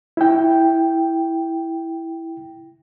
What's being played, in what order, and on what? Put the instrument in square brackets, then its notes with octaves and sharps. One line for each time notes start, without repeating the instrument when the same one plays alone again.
[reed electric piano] E4 G5